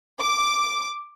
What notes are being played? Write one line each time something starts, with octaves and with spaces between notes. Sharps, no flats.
D6